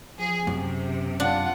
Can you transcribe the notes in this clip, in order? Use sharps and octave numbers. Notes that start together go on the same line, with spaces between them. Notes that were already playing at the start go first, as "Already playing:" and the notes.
F3 G#4
F#2 C3
D4 F4 F#5